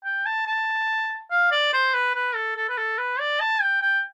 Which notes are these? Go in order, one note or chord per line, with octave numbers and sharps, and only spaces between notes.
G5
A5
A5
F5
D5
C5
B4
B4
A4
A4
B4
A4
B4
D5
A5
G5
G5